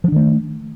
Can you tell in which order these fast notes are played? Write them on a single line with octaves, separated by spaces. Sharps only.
F3 D4 D#3 A3